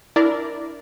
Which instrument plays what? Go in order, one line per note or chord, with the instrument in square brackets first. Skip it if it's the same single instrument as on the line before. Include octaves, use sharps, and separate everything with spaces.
[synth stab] D4 E4 A#4 D5